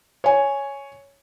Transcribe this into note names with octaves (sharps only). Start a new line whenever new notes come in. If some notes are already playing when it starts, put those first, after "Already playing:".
C#5 G#5